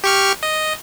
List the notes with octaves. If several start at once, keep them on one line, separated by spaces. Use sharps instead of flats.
G4 C#6 F6
D#5